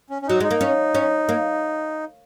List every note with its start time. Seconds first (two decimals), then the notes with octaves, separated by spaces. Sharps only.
0.10 C#4
0.22 C#4
0.27 F#3 D#4
0.40 G#3 D#4
0.51 A#3
0.61 C#4
0.95 C#4
1.29 A#3